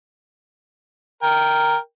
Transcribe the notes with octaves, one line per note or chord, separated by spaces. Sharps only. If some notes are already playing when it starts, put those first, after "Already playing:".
A#4 G5